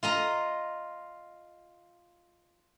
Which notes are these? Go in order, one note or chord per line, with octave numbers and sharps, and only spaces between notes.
F4 D#5 A#5